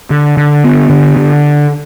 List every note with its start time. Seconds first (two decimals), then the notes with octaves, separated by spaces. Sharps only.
0.10 D3
0.37 D3
0.64 B3
0.90 D3
1.17 D3